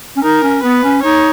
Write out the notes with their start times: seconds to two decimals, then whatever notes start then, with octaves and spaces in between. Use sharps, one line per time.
0.15 C#4
0.23 D#4 A#4
0.43 C#4
0.63 B3 B4
0.83 C#4
1.03 D#4 C#5